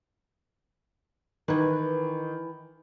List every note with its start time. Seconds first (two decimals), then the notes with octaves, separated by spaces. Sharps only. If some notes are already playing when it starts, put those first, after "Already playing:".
1.48 D#3 E3 B4